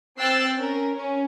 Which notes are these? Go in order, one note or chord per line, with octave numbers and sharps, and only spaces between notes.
C4 G5 E6 F#6 A6 C7
C#4 A#4
C#4